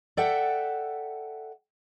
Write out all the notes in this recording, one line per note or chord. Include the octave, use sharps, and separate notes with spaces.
A4 D5 E5 F#5 G5